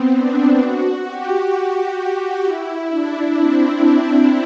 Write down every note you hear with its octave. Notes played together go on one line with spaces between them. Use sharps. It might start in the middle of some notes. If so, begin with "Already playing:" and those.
Already playing: B3 C4
D4
F#4
G4
F#4
E4
D4
C4